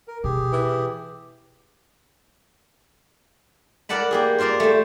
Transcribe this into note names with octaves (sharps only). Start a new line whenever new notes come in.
A#4
B2 G4 G#4
E3
A#4 D5 F#5 A5 B5
A#3 G4 G#4
F4 A#4 C5 D5 A#5
A3 C5